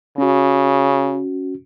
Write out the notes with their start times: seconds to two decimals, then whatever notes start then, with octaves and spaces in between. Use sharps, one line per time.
0.18 C#3 C#4 F#4